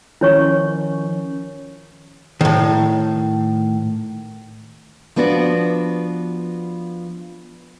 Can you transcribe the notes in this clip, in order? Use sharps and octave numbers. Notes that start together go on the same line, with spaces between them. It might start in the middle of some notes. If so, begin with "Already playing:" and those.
D#3 F3 C#4 E4 C#5 C#6
A2 D#3
F3 B3 D4 F#4 D5